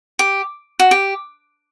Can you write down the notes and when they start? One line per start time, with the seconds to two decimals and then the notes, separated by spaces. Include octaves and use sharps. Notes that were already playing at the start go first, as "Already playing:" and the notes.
0.19 G4
0.79 F#4
0.91 G4